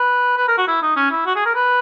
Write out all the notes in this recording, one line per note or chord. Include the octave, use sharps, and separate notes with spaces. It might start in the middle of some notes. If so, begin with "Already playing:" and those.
Already playing: B4
B4
A#4
F#4
E4
D#4
C#4
E4
F#4
G#4
A#4
B4